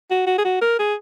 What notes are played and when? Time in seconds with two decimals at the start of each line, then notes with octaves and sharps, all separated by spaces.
0.11 F#4
0.27 F#4
0.38 G#4
0.44 F#4
0.61 A#4
0.79 G#4